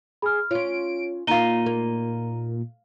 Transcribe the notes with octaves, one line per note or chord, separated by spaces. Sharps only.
G#4 B5 F6
C#4 F4 C#5 D7
A#2 D#4 F4 A#5 D#7 G7
A#3